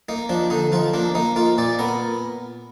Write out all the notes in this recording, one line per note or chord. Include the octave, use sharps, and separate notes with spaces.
A#3 D#4
F3 D4
D3 D#4
F3 F4
A#3 D4
A#3 D#4
A#3 F4
A#2 D5
B3 A#4